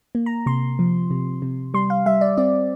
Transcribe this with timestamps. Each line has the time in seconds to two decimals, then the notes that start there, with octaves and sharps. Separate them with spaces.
0.15 A#3
0.26 A#5
0.46 C3 C6
0.79 F3
1.11 C3
1.42 C3
1.74 G3 C6
1.90 F5
2.06 G3 E5
2.21 D5
2.37 C4 D5